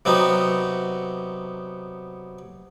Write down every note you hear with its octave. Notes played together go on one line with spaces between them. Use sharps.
C3 F#3 B3 D#4